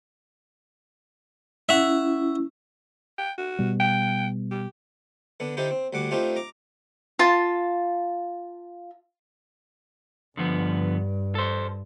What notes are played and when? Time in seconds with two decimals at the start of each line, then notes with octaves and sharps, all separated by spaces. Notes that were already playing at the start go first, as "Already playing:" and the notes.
1.69 C#4 E4 E5 F#5
3.18 G5
3.38 F#4
3.59 B2 G3
3.80 G5
4.51 G4
5.40 D3 B3 D4
5.57 D3 D#4 E4 G4 A4 C5
5.71 C4
5.93 D2 D3 G3 F#5 D6
6.11 A3 C4 D4 D#4 F4 G4
6.36 A#5 D6
7.19 F4 A5
10.37 G2 D3 F3 B3
11.35 A4 C5